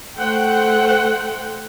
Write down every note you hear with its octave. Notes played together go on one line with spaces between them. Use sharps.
A3 C5 F#5 G5